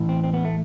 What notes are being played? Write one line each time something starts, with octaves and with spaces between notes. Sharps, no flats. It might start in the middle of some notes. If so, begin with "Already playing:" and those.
Already playing: A2 E3
C4
C4
B3
A3